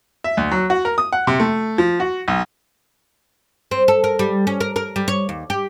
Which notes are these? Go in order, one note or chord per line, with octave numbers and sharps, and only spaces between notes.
E5
D2
F#3
F#4
A#4
D#6
F#5
C3
A3
F3
F#4
B1
C4
A4
A#4
G3
C#4
A#4
A#4
G3
C#5
D#2
G4